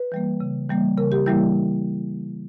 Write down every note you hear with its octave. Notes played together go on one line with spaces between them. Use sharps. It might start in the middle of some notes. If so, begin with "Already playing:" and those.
Already playing: B4
E3 G3 A#3
C#3
E3 G3 A#3
C#3 A#4
G4
E3 G3 A#3 E4